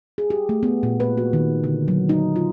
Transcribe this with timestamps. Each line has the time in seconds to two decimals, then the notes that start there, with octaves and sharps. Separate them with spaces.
0.18 G#4
0.30 G4
0.49 A3
0.63 B3
0.83 A#2
1.00 B4
1.17 F#4
1.33 D#3
1.64 D3
1.88 F#3
2.09 D#4
2.36 F4